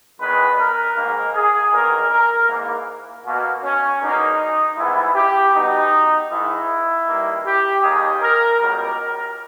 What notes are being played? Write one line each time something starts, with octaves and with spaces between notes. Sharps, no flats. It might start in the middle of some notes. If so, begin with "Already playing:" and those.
E2 D#3 G#3 B3 B4
A#4
G#2 D#3 A#3
G#4
E2 D#3 A#3 A#4
A#4
G#2 E3 A#3
B2 A#3
C#4
E2 B2 A#3 D#4
G#2 D#3 G3 B3 E4
G4
B2 G3 B3 D#4
G#2 D#3 G#3 E4
G2 D#3 A#3
G4
D#2 D#3 G3 A#3 G#4
A#4
C#2 B2 G3 A#4